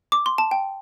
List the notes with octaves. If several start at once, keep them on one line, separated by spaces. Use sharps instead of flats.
D6
C6
A5
G5